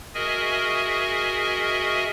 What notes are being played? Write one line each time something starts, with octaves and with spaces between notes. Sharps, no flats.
F#4 G#4 A#4 D#5 E5 G#5